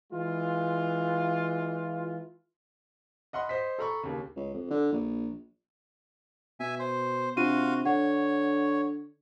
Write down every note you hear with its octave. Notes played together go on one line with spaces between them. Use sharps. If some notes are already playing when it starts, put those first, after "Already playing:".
E3 G#3 F4
D#5 F#5 B5 C6
C5 D#5 B6
A4 A#5 B5 C#6
D#2 C#3
C#2
F2
D3
A#1
B2 E5 G#5
C5
C3 D4 F4 F#4 F5 C6 D#7
D3 C#5 F#5